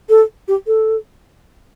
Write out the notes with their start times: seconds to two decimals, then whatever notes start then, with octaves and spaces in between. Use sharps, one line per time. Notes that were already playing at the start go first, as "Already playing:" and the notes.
0.09 A4
0.48 G4
0.67 A4